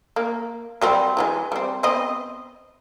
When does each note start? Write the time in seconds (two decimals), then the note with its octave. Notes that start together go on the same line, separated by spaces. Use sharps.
0.16 A#3
0.81 F#3 G3 C4
1.17 E3 F#3 G#3
1.52 G3 C4
1.83 B3 C4 D#5